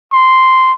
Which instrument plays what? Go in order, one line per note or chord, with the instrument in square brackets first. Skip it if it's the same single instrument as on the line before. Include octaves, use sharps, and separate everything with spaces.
[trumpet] C6